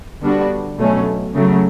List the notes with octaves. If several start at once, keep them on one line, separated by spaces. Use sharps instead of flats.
D3 G3 B3 D4 F#4
B2 F#3 A3 C#4
C#3 F#3 A3